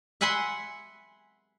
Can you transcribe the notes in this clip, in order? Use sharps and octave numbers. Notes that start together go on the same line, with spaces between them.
E5 F#5 G#5 B5 C6